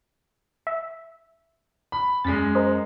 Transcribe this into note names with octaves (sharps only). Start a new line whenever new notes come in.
E5
B5
F#2 G#3 A6 B6
A#4 C5 D#5